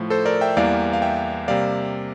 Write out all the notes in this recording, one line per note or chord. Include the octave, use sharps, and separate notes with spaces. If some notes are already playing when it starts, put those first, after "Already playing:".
Already playing: A2 F3 A3
A4 C5
A#4 D5
E5 G5
E2 E3 G3 A#3 D5 F5
F5
E5 G5
C3 G3 A#3 D5 F5